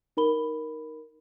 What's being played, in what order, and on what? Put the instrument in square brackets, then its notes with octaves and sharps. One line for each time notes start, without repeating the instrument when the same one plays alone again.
[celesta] D#4 A#4 B5 G7